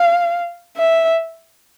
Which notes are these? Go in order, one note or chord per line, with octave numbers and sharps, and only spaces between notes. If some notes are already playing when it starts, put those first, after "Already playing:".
Already playing: F5
E5